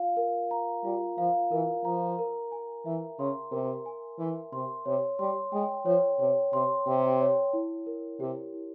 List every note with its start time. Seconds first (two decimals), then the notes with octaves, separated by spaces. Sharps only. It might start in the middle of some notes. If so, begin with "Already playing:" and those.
Already playing: F4 F5
0.17 A#4
0.51 A#5
0.84 G3 F4
1.18 F3 F5
1.51 E3 A#4
1.84 F3 A#5
2.19 A#4
2.52 G#5
2.86 E3 E5
3.19 C#3 C6
3.51 C3 A#4
3.86 G#5
4.19 E3 E5
4.52 C3 C6
4.86 C3 C#5
5.19 G3 C6
5.52 G#3 G5
5.86 F3 C#5
6.19 C3 C#5
6.53 C3 C6
6.87 C3 G5
7.21 C#5
7.53 E4
7.86 A#4
8.20 C3 G4
8.54 E4